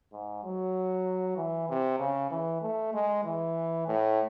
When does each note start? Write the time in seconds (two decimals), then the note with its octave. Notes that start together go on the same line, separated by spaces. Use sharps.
0.13 G#2
0.44 F#3
1.37 E3
1.69 C3
2.00 C#3
2.31 E3
2.62 A3
2.94 G#3
3.25 E3
3.87 A2